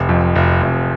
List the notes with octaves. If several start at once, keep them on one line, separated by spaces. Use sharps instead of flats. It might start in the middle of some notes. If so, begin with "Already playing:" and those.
Already playing: F1
F2
F1
F1